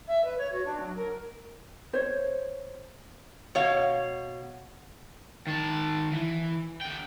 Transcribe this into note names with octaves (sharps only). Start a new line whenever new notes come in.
E5
B4
C#5
F#4
D4
F#3
A#4
C5 C#5
B2 C#5 F5
D#3 A5
E3
D3 G5